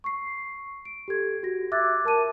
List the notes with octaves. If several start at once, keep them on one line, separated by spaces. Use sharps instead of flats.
C#6 C7
D7
G4 A4 G#6
F#4 A#6
E5 D6 E6 F#6 G#6 A6
A#4 A5 D6 D#7